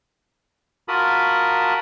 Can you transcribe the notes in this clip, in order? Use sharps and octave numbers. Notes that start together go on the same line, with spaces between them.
F4 F#4 A#4 A5 B5 D#6